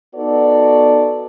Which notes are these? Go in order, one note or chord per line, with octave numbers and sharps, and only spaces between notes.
B3 D#4 F#4 A4 D5